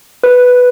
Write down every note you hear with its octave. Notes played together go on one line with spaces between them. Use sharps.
B4